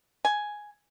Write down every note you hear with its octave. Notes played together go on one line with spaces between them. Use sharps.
G#5